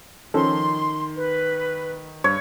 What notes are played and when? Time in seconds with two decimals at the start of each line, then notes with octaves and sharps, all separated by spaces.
0.34 D#3 F3 C#4 A4 C6
1.16 B4
2.24 G2 C#5